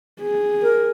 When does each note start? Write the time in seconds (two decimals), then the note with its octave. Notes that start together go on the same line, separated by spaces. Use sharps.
0.21 G#4
0.62 A#4